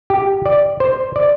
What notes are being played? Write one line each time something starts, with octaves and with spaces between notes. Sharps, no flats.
G4
D5
C5
D5